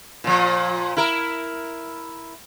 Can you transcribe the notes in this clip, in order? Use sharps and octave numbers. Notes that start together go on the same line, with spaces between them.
A#2 F3
E4 A#4